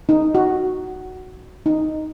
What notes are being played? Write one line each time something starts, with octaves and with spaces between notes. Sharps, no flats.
D#4
F#4
D#4